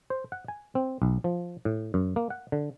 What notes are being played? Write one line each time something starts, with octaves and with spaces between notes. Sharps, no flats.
C5
F#5
G#5
C4
B1
F3
A2
F#2
A#3
F#5
D3